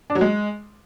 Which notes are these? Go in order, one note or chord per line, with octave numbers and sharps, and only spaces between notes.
D4
F#3
G#3